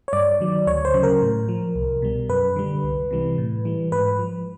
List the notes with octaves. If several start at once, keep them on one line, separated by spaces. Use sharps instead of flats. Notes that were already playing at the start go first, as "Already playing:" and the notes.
C#5
G2 D5
D#3 F#3
D2 C#5
C5
C#3 F#3
A#4
A2
F3
C2
B2 G3
F#2 B4
D3 G3
C2
C3 E3 G3
A2
E3 G3
G#2 B4
F3